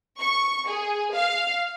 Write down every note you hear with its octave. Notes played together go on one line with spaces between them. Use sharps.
C#6
G#4
F5